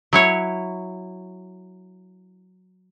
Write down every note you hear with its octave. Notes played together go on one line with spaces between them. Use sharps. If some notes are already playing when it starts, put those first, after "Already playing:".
F#3 E4 C#5